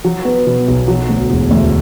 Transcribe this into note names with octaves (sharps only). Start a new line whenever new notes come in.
F#3
B3
B2
B1
F#3
D2
E1
D2